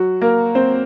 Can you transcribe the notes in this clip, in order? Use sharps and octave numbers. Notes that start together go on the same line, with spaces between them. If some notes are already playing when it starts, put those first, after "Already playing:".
Already playing: F#3 F#4
A#3 A#4
C4 C5